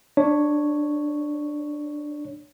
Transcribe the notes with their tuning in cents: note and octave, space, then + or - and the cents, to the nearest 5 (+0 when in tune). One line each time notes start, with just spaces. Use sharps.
D4 +10 C#5 +0